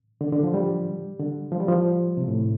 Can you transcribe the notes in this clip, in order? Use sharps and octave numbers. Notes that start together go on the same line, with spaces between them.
D3
D3
F3
G3
D3
F3
G3
F3
C3
A2